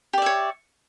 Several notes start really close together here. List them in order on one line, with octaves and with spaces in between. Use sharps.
G4 D5 E5 C#5